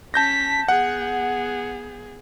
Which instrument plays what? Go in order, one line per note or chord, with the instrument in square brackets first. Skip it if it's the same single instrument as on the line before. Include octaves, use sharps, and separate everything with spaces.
[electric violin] C#4 B6 [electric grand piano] A5 G6 A#6
[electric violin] B3 G#4 [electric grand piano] F#5